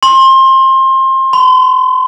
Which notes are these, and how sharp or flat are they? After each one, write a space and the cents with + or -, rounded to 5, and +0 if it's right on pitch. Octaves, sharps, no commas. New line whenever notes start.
C6 +25
C6 -45